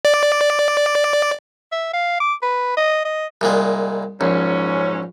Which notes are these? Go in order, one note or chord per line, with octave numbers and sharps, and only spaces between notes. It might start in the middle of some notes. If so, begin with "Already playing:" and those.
D5
E5
F5
D6
B4
D#5
D#5
C2 A#2 G#3
A#1 G#2 F#3 C#4